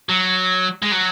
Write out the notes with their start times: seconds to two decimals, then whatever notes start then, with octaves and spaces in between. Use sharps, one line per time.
0.09 F#3
0.82 G#3
0.92 F#3